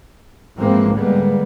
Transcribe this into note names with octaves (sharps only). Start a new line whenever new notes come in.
G#2 E3 F3 G#3 A#3 C4
D3 G3 G#3 A#3 B3